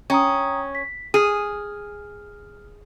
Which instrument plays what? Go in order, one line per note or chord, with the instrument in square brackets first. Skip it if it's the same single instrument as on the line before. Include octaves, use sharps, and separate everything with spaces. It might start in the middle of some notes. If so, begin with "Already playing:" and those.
[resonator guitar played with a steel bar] C#4 [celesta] G5 A#5 D#6
[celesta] B6
[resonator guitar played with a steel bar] G#4 [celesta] F6